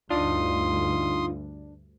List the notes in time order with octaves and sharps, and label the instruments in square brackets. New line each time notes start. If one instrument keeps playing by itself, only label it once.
[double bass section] D2 G2 [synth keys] D4 [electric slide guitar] D#4 F4 [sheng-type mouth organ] C6 D#6